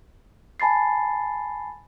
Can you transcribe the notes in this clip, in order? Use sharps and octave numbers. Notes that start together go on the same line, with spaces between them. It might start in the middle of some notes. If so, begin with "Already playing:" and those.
G#5 A5 B5 A6 C7